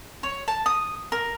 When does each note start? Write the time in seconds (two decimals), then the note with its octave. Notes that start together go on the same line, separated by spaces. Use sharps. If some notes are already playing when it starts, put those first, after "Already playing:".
0.23 C#5
0.48 A5
0.66 D#6
1.12 A#4